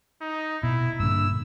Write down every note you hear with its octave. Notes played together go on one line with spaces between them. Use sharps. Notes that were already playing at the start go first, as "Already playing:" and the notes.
D#4
B2 E4
G2 A#2 D3 E6